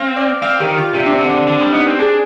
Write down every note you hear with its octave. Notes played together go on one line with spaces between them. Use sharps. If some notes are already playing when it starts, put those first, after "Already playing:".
Already playing: C4 F5
D5
C4 F5
D#3 G4
F4
C3 G4
D4
C4
D3
D4
D3 D4
G3
D4
B3 D#4
C4
D4 G#4